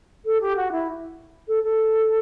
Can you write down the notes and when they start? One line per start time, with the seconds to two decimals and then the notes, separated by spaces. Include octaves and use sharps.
0.25 A4
0.41 G4
0.56 F#4
0.71 E4
1.48 A4
1.63 A4